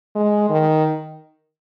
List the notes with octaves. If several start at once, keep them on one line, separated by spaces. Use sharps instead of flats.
G#3
D#3